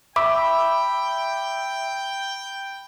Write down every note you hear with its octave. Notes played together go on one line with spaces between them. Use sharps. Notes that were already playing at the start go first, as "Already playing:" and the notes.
E5 G5 B5 D6